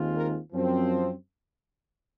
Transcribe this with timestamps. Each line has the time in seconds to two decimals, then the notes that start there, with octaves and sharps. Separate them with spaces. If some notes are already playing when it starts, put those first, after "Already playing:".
Already playing: D#2 D#3 G#3 C4 F4
0.15 A#4
0.53 F#2 F3 C4